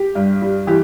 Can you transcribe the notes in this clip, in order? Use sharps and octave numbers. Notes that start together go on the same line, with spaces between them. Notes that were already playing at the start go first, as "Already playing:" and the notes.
Already playing: G4
G2
G3
E3 G4